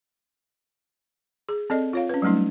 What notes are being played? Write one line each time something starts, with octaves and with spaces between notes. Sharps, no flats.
G#4
C4 A4 D5 D#5
F4 C#5 F5
C#4 B4
F#3 G3 A3 C#4 D#4